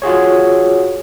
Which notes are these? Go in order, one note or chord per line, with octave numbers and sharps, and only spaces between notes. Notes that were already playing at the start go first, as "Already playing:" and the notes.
F4 F#4 G#4 C#5